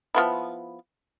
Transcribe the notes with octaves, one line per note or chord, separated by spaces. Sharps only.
F3 B3 E4